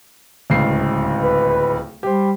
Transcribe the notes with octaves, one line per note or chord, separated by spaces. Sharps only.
D1 C#2 C7
B4
G3 G4 C5